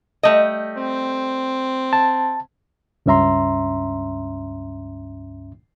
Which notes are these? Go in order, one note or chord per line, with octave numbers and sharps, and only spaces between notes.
G3 A3 D#5
C4
A5
C#2 G2 C#4 E5 A#5 C6